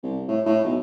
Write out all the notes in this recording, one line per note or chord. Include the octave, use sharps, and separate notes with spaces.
C2
A2
A2
B1